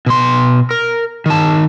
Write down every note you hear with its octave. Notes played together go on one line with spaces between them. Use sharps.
B2 C6
A#4
D#3 A5